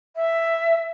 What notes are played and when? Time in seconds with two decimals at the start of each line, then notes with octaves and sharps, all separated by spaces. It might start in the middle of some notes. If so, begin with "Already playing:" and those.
0.16 E5